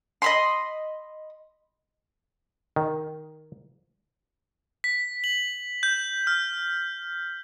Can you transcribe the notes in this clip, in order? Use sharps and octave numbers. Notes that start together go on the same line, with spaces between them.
D#5 B5 C6
D#3
B6
F#7
G6
F6